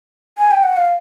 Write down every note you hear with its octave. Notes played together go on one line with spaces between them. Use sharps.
G#5
G5
F#5
F5